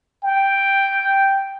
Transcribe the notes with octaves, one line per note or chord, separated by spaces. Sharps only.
G5